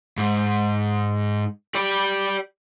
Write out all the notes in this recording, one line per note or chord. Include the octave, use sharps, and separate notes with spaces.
G#2
G4 D5